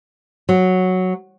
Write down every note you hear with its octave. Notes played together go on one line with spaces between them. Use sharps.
F#3